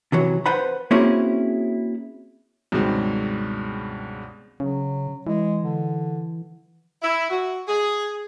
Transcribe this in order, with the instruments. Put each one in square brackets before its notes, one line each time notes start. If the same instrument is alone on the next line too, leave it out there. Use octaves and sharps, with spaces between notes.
[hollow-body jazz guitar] C3 E3 F#3
B4 C5 F#5 B5
A#3 C4 C#4 E4 F#4 G#4
[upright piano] C#2 G2 B2 D#3 G#3 C4
[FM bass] C#3 [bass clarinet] F#3
[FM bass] E3 [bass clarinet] G#3
[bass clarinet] D3
[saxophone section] E4
F#4
G#4